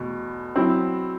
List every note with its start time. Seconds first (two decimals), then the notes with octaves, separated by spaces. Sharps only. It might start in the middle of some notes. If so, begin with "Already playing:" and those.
Already playing: E2 B2 A3
0.56 F#3 C4 E4